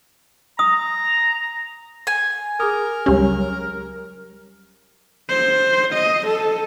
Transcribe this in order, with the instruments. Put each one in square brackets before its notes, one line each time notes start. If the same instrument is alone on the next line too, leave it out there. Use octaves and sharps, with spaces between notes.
[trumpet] A#5 [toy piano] D#6
[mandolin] G#5
[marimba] G#4 D6 D#6 [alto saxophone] A#4
[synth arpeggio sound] C#2 C#4 [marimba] F#3 G3 G4
[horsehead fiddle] C5
D#5
A4